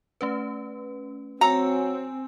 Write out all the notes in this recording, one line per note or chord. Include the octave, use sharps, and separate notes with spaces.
A3 C#4 B4
F#3 C4 G#5 A#5 E6